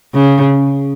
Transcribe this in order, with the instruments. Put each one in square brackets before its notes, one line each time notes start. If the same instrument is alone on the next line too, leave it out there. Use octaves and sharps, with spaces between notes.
[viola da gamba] C#3